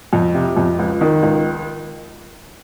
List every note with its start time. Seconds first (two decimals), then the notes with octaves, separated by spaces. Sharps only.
0.13 F2
0.35 C3
0.57 F2
0.79 C#2
1.01 D#3
1.23 C#2